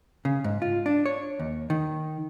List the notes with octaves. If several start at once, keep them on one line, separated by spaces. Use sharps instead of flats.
C#3
G#2
F4
D4
C#5
D#2
D#3